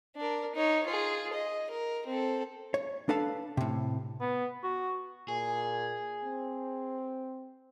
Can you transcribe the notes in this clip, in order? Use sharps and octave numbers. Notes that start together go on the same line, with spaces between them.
D4 A#4
D#4 C#5
F4 G#4
D#5
A#4
C4 A4
C#5
D4 A4 B4 F5 A5
A2 C3
B3
F#4
A#2 G#4
C4